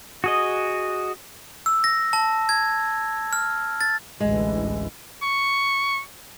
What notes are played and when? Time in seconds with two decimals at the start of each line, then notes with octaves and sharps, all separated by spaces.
0.24 F#4 G#4 D#5
1.66 E6
1.84 A#6
2.13 A5
2.49 G#6
3.33 F6
3.81 A6
4.20 A1 D2 E3 G#3
5.22 C#6